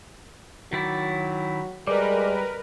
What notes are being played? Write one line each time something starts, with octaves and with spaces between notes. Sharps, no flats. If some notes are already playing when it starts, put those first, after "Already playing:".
D#3 F#3 E4 D5
G3 G#3 A#4 B4 D5